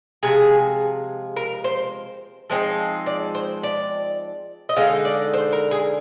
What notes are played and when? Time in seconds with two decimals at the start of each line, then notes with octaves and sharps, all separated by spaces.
0.23 C3 F3 G#3 G#4
1.36 A#4
1.64 C5
2.50 F3 G#3 C4 D#4
3.06 D5
3.35 C5
3.63 D5
4.69 D#5
4.77 D3 G#3 D#4 F5
5.05 D5
5.34 C5
5.53 A#4
5.71 G#4